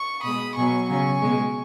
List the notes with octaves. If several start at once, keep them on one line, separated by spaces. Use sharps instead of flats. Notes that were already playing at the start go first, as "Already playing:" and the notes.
Already playing: C#6
B2 G#3 B5 D#6
B2 F#3 G#5 C#6
C#3 F#3 G#5 C#6
B2 G#3